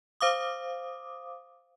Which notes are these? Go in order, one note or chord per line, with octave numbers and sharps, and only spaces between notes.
C5 F5 D6 D#6